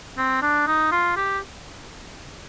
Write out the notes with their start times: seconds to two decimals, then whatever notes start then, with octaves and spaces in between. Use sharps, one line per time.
0.17 C4
0.42 D4
0.67 D#4
0.91 F4
1.16 G4